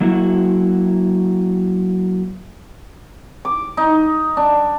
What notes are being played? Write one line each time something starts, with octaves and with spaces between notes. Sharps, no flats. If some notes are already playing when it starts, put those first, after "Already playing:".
F#3 A#3 E4 F#4
D6
D#4
D4